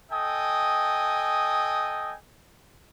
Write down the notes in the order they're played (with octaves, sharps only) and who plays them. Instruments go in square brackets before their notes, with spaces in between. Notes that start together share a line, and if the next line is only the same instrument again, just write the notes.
[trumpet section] A4 D#5 G5 G#5 D#6